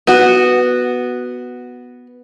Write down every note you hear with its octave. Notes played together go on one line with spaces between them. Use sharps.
B3 F#4